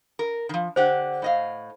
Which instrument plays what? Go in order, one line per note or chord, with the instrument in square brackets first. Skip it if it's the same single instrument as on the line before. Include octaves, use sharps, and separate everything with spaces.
[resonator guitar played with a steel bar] A#4
D#3 F3
[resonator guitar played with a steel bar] D3 G4 F#5 [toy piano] C5
[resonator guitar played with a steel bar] A2 D#5 F5